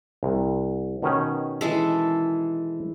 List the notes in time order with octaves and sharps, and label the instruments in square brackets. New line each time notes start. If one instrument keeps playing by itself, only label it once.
[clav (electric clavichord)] C2
B2 D#3 C#4
[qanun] E3 G#3 A4